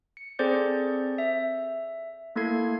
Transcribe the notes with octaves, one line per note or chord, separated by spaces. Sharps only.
C#7
C4 G#4 A4 C5 D5 G6
E5
A3 A#3 E4 A4 G#6 C7